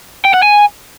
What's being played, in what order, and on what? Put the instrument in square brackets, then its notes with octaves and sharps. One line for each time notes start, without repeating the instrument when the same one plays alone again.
[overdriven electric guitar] G5
F#5
G#5